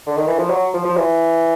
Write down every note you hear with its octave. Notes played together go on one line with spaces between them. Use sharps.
D3
D#3
E3
F3
F#3
F3
F3
E3